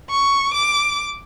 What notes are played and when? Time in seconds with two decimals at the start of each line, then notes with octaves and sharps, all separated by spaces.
0.10 C#6
0.54 D6